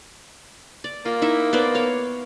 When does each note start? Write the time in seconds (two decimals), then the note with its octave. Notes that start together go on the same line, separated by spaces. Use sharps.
0.84 D5
1.05 A#3 F4
1.22 D#4 E4 E5
1.53 B3 C5 D5
1.75 C#5 F5